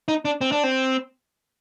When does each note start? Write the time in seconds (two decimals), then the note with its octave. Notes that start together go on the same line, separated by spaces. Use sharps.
0.08 D#4
0.25 D4
0.41 C4
0.52 D4
0.64 C4